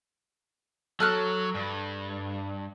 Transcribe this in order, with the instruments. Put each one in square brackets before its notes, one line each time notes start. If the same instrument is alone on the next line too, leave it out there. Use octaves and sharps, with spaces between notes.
[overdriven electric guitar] F#3 [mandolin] A4 F6 F#6
[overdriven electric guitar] G2